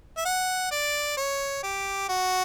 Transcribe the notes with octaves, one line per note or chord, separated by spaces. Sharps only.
E5
F#5
D5
C#5
G4
F#4